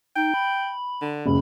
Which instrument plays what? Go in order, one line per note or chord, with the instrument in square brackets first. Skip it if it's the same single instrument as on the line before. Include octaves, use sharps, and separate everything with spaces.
[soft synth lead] D#4 [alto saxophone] G5
[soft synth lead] B5
[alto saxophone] D3
[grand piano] F#1 C#2 [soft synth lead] B5